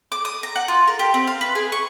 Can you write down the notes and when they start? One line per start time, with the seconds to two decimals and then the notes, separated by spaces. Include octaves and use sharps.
0.12 D6
0.25 D#6
0.43 A#5
0.56 F#5
0.68 F4
0.87 A#4
0.99 G4
1.14 C4
1.27 F5
1.41 B4
1.55 G#4
1.72 C#6